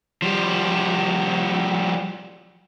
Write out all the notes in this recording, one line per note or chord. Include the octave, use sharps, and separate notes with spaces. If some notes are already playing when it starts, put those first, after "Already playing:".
F3 G3